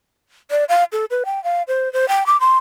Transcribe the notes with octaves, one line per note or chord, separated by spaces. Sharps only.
D5
F5
A4
B4
G5
F5
C5
C5
G5
D6
C6